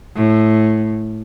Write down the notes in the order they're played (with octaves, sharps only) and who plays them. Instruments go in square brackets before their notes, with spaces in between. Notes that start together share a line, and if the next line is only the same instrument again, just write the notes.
[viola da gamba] A2